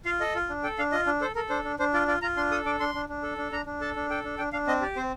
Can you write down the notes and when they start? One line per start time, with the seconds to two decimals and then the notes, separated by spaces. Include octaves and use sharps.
0.05 F4 F5
0.20 A4 D#5
0.35 F4
0.49 D4
0.64 A4 G5
0.78 D4 F5
0.92 F4 D#5
1.06 D4
1.21 A4 C5
1.35 A4 A#4
1.49 D4 C5
1.64 D4
1.79 D4 C5
1.93 F4 D5
2.08 F4 D5
2.22 F4 A#5
2.37 D4 C6
2.51 A4 D#6
2.65 D4 D6
2.80 D4 C6
2.95 D4
3.09 D4
3.23 A4
3.38 D4
3.52 D4 A#5
3.66 D4
3.81 A4 A5
3.96 D4
4.10 A4 G5
4.24 D4
4.38 D4 G5
4.53 D4 F5
4.67 C4 D#5
4.81 G4 D5
4.96 C4 C5